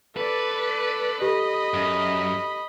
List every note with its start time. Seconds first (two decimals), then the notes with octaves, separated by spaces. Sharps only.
0.17 A4 B4 D5
1.22 G4 A4 D#5 B5
1.74 F#2